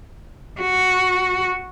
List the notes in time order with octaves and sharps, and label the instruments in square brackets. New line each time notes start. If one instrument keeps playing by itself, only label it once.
[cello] F#4